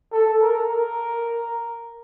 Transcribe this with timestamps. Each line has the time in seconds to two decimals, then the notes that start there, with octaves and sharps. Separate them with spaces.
0.12 A4
0.42 A#4
0.69 A#4